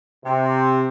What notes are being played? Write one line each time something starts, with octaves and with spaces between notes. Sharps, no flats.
C3